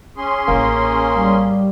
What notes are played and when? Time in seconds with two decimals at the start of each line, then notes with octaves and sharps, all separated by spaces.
0.17 C#4 G#4 C6
0.48 A1 A#3
1.16 G3